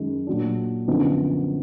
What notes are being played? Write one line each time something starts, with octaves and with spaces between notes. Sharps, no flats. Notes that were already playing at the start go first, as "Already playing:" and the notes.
Already playing: F#2 D#3 G#3 D#4
A#2 F#3 D4
F#2 D3 F3 B3 D#4